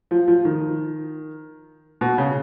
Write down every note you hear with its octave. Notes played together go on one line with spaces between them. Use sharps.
F3
F3
D#3
B2
C#3